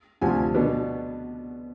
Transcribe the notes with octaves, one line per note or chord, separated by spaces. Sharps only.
D2 C3 F3 G#5
B2 B3 D4